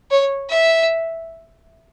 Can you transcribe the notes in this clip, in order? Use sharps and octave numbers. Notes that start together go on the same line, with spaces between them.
C#5
E5